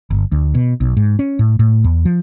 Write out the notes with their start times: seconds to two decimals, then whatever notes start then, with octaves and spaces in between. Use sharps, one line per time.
0.10 G1
0.32 D2
0.55 B2
0.80 B1
0.97 G#2
1.19 C#4
1.39 A2
1.59 A2
1.84 E2
2.05 F3